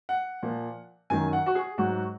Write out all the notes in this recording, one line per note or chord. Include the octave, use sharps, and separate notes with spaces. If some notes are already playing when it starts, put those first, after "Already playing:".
F#5
A#2 F3
F#2 D#3 F#3 G#5
F#5
F#4
G#4
G#2 F#3 F#4